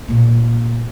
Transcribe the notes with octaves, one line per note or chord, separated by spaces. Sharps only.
A#2 A#3